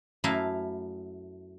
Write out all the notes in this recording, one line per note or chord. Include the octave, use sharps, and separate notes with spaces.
F#2 A3 E4 F5 G#5 A#5